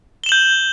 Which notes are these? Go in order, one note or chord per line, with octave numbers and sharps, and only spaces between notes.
G6 E7 F#7 G7